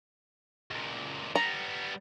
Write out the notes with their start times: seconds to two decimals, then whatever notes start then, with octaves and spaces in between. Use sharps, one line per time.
0.71 C#2 A#2
1.36 G3 B3 A#5